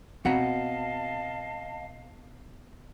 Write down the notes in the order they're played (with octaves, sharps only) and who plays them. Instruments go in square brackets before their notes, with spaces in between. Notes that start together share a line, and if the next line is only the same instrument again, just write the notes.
[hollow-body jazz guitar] B2 F#5 A#5 [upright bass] C4 [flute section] D#5 F5 A5